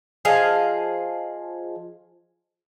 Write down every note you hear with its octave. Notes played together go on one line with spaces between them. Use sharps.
F3 G#4 D#5 F5